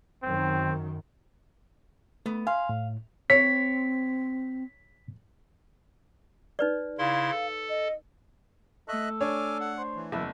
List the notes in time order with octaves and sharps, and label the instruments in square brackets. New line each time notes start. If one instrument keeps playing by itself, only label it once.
[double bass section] F#2 D#3 [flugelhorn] C4
[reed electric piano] A3 [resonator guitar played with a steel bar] B3
[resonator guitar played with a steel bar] F5 [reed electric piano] G#5 C6
[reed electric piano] A2
[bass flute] C4 [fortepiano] C#5 [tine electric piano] B6
[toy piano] D#4 B4 D5
[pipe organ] C#3 E4 C6 [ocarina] F5
[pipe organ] A4
[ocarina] D#5
[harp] A3 C#6 [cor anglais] A4 [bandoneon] D#5 E5 F#6
[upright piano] D4 C#5 [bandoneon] G#5 D6 F6
[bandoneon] F#5
[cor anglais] C5
[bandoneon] E3
[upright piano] F#1 [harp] E2 A5 [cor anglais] E4